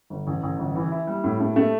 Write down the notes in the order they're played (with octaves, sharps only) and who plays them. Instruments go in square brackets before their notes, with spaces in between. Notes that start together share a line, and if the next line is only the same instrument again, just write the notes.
[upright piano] G1
A1
A1
G1
E3
E4
G3
A2
A3
A3